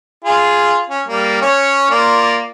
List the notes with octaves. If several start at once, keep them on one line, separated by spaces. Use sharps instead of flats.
F4 G#4
C#4
G3 A#3
C#4 C#5
A#3 F4 D5